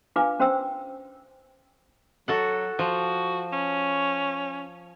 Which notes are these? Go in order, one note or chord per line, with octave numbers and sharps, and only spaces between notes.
D4 F4 B4 F5 G#5 D6
C#4 F#4 C5 G5 E6
F#3 F#4 A4 F#5
F3 F#4
C#4